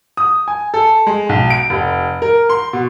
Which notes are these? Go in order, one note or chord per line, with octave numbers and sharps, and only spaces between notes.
D#6
G#5
A4
G#3
B1
D7
F1
A#4
C6
B2